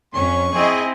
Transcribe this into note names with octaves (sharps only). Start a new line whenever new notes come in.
F2 C#4 C#6
C4 E4 G#4 D#5